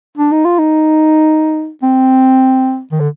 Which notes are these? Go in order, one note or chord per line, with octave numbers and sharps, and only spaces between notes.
D4
D#4
F4
D#4
C4
D#3
D3